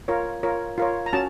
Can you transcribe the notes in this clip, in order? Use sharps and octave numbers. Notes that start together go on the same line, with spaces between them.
F4 A#4 C#5
F4 A#4 C#5
F4 A#4 C#5
A#5
C#4 F#4 A5